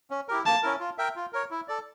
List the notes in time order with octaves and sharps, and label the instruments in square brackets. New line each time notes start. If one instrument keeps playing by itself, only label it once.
[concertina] C#4
E4 G4 A#4
[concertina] A#3 [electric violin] A5
[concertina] C#4 E4 A#4
F4
A#4 E5 G5
F4
A#4 C#5
E4
A4 D5